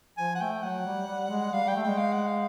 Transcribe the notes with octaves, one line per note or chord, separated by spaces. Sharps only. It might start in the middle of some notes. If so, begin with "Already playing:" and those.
F3 G#5
F#5
A3 G5
F#3 F#5
G3
G3
G#3
G3 F5
G3 G5
A3
G#3 G5
F5
F#5
F5